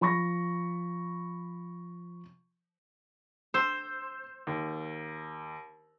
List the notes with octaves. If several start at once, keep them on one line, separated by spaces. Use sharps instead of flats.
F3 B5 C#6 A#6
C5 C6 E6
D#2